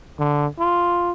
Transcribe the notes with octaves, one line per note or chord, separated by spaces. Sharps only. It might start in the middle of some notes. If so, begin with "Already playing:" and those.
D3
F4